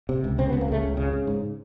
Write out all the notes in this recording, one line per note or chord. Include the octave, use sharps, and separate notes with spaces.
C3
C#2
C#3 C4
B3
C#2
A#3
C#3 A3
C#2
C#3
C#3
G#2